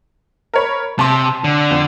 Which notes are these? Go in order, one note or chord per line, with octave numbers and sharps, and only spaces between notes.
A#4 C#5 B5
C3 A5 C6
D3
F2